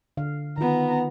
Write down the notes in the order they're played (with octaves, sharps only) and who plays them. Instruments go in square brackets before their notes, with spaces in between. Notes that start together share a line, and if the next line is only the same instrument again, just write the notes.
[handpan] D3 F5
[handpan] D#3 F4 [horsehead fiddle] B3 A#5